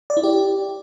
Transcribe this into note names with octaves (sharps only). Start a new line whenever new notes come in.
D5
E4
G4